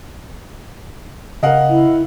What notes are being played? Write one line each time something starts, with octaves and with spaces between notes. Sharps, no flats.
C#3 A#4 D#5 F5 F#5
E4